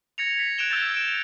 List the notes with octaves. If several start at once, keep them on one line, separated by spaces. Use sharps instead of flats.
G#6 A#6 C#7 F7
B6
F#6 G#6 D7 E7 F7 G7
E6 G6 A6 E7
D7 E7